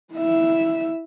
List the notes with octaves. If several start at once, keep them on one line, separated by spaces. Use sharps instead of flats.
E4 E5